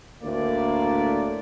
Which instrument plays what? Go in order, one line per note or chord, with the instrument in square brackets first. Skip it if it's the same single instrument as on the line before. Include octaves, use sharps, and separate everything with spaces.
[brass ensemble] D2 A2 A#3 D5